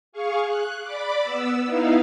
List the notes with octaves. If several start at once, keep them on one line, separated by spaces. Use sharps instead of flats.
G#4 F5 C#6
F#6
D5 B5 D6
B3 E6
B3 D#4 E4 F5